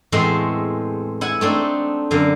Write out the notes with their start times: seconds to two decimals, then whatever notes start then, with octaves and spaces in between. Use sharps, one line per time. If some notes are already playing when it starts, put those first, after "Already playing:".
0.12 E2 A2 G#3 A3 C4 C5
1.21 E4 F#5 G#5
1.41 A3 C4 D4 D#4
2.11 F#2 D3 F5